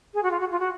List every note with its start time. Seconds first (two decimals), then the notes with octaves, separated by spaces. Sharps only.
0.13 G#4
0.22 F#4
0.30 F4
0.39 F#4
0.50 F4
0.59 F#4